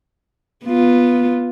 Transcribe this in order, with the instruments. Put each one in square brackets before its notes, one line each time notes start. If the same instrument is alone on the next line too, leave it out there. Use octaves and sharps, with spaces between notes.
[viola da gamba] B3 F4